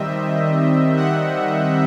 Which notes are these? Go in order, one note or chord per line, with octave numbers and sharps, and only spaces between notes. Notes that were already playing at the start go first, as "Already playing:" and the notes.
Already playing: D#3 G3 C4 D#5 E5
F#5